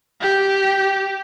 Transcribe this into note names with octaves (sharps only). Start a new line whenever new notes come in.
G4